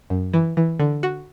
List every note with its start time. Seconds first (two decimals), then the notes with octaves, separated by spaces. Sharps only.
0.10 F#2
0.33 E3
0.57 E3
0.80 D3
1.03 F#4